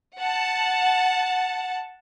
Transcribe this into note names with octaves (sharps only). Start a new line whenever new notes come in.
F#5 A5